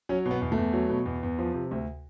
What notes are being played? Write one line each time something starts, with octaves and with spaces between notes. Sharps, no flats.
F#3 C#4
B2
B3
E2
A3
E2
F#3
B2
E2
E2
F3
C3
D2